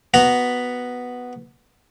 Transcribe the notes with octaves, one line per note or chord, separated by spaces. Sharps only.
B3 F#4 A#5 B5